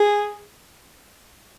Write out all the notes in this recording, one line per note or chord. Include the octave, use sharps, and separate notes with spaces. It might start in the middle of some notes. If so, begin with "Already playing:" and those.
Already playing: G#4